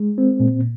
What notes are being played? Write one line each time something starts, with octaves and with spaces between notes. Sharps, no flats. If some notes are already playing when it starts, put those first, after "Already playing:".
Already playing: G#3
C4
A#2